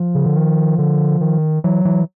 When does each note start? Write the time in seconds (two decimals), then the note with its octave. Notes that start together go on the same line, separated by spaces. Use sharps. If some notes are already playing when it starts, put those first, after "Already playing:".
Already playing: F3
0.15 C#3
0.26 D3
0.37 D#3
0.78 D3
1.21 D#3
1.64 E3 F#3
1.85 E3